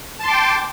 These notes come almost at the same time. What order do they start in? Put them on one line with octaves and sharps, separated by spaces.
A5 C6 D6 G5